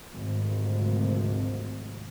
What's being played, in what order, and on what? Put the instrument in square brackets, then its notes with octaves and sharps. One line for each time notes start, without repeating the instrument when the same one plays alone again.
[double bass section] G#1 D2 C3 F3